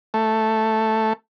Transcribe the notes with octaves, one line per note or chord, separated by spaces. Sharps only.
A3